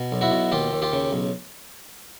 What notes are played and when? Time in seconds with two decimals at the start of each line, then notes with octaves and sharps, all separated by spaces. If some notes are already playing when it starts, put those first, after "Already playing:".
Already playing: B2
0.12 B1
0.21 E4 F#4
0.31 B2
0.52 D#2 F4 G4
0.73 D#2
0.82 F4 G4
0.93 C#3
1.12 B1